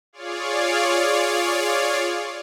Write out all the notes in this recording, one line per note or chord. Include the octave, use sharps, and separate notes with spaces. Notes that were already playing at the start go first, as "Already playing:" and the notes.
F4 G#4 C#5 D5 F5